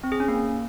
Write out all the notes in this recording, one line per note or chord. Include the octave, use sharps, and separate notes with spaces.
C4
G#4
C#4
A#3